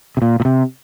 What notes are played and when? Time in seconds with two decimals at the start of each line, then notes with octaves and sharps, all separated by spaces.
0.17 C3
0.22 A#2
0.40 A#2
0.45 C3